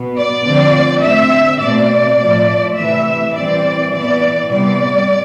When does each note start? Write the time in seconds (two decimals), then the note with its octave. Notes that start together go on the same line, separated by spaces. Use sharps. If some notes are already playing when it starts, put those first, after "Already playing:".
Already playing: B2 B3
0.15 D5
0.44 D3 F3 A3 C4
1.02 D3 A3 C4 E5
1.60 B2 A3 C4 D5
2.18 A2 F3 A3
2.76 C3 E3 A3 E5
3.34 E3 G3 C4 D5
3.92 E3 B3 D5
4.50 C3 G3 B3 D5